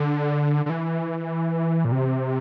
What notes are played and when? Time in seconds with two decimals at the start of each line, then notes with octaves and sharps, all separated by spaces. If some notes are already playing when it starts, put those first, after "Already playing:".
Already playing: D3
0.66 D3
0.70 E3
1.85 A#2
1.92 C3